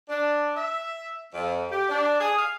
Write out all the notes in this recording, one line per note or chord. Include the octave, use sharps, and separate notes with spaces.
D4
E5
F2
G4
D4
G#4
F5